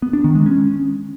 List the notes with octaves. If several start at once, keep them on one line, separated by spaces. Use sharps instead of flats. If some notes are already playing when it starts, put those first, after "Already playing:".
B3
D4
D#3
G#3
C#4